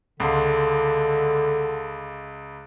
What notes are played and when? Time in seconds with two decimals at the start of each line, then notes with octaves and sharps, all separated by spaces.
0.20 C#2 D3 C6